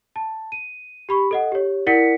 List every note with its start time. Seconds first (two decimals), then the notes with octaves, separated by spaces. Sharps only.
0.16 A5
0.52 D#7
1.09 G4 B5 C#6
1.31 A4 D#5 F#5
1.52 G4 C#5
1.87 E4 A#4 D5 F#5 B6 C#7